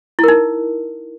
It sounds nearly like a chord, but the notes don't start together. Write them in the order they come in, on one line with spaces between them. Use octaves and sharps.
E4 A#4 D#4